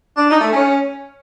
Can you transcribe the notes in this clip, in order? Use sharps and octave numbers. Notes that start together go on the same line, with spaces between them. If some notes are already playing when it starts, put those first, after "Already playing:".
D4
D#4
A3
C#4